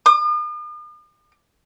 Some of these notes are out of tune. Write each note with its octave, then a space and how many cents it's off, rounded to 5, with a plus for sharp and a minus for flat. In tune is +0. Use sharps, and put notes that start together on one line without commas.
D#6 -45